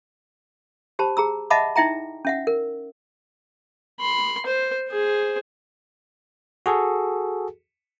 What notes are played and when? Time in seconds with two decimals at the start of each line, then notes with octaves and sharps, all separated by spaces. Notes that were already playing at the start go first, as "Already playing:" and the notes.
0.99 G4 C5 A5 B5
1.17 G#4 A#5 E6
1.50 D#5 E5 F#5 A5 B5 D6
1.76 D#4 E4 E5 G5 A#5
2.25 C#4 E5 F#5
2.47 A#4
4.00 B5 C6
4.46 C5
4.89 G#4 C5
6.66 F#4 G#4 A4